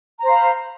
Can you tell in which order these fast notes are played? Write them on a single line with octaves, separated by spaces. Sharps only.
A#5 C5 F5 B5